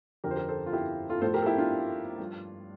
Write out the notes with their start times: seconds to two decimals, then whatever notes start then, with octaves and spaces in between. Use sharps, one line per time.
0.24 F2 D3 F3 G4 A#4
0.31 C5
0.36 G4 A#4
0.48 A4 C5
0.66 F4
0.73 E4 G4
1.09 F4 A4
1.21 A2 F3 A4 C5
1.34 G4 A#4
1.42 A4
1.46 E4 G4
1.58 D4 F4
2.19 G2 F3